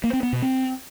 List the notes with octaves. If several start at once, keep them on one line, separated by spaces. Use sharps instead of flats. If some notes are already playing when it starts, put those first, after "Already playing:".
A#3
C4
B3
B2
C4